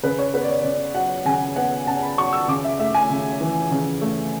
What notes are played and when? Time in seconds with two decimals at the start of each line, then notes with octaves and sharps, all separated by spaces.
0.03 C#3 B4
0.19 C#5
0.34 B3 B4
0.43 D5
0.49 C#5
0.60 C#5
0.64 C#3 D5
0.95 F#3 F#5
1.25 C#3 G#5
1.56 B3 F#5
1.87 C#3 A5
2.02 B5
2.18 F#3 C#6
2.33 E6
2.48 C#3 D6
2.64 E5
2.80 A3 E5
2.94 G#5
3.10 C#3
3.41 E3
3.71 C#3
4.01 A3